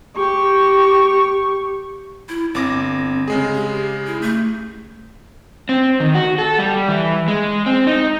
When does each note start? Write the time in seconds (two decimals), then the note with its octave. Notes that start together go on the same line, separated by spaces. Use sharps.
0.17 G4 C#6
2.29 E4
2.55 G1 C4 D6 A#6
3.28 C#3 G#3 G#4
3.54 G4
4.07 E4
4.22 A3
5.69 C4
6.00 D#3
6.14 F#4
6.38 A4
6.59 G3
6.88 E3
7.28 G#3
7.66 C4
7.87 D#4